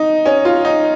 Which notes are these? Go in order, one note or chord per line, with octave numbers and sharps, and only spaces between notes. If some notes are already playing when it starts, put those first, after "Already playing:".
Already playing: D#4
C#4
F4
D#4